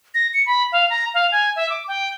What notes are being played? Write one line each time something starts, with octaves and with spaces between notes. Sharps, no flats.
A#6
C#7
B5
F5
A#5
F5
G#5
E5
D6
G5